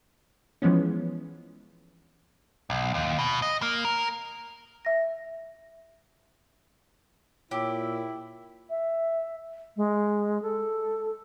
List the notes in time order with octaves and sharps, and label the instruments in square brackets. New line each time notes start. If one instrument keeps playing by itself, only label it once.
[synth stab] E3 F3 G#3 B3 C#4
[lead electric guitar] B1
D#2
B2
D#5
A#3
A#4
[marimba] E5 A#6
[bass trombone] A#2 [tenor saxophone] E4 [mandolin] G4 [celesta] C#5 G5 E6
[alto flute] E5
G#3
A4